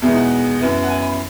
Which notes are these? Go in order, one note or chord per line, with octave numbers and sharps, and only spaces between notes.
E2 B2 G#3 B3 D#4 E5
F#5
F#2 E3 B3 E4
F#5
G#5
B5